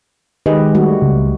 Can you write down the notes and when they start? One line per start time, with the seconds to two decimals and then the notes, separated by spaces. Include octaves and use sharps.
0.46 D#3 G#3 G4 B4 D#5
0.75 G3 A3 F#4
1.02 C#2